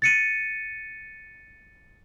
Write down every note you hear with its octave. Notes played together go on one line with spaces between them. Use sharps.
A6 C#7 D#7